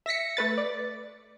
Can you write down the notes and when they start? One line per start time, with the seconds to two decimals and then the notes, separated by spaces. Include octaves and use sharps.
0.06 E5 A#6 B6 C#7
0.37 A3 B4 A6
0.58 D5